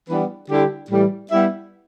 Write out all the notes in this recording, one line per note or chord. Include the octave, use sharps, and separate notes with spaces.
E3 G3 B3 D4 B4
D3 G3 E4 G4
A2 E3 G3
G3 B3 E4 G4 E5